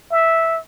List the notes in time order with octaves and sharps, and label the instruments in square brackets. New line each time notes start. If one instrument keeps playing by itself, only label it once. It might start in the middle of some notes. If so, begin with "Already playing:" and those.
[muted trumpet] E5